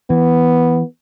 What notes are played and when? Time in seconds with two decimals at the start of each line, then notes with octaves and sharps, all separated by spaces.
0.10 E3 B3